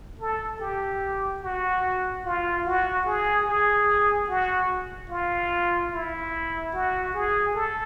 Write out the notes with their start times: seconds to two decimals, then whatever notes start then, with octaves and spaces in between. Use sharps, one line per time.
0.20 A4
0.61 G4
1.43 F#4
2.25 F4
2.65 F#4
3.06 G#4
3.46 G#4
4.29 F#4
5.10 F4
5.92 E4
6.73 F#4
7.14 G#4
7.55 A4